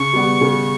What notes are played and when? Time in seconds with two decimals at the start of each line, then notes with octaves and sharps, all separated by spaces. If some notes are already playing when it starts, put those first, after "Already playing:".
Already playing: C#3 C#6
0.13 G3 B3
0.41 C#3